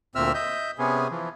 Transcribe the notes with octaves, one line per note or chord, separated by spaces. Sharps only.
D2 A#2 C4 E5 E6 F6
D#5 E5 G6
C3 B3 C#4 G#4
E3 F3